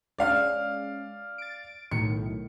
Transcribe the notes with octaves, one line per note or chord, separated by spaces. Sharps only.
G#3 C#4 D5 F5 F6
A6 D7
B1 A2 D#3 C#7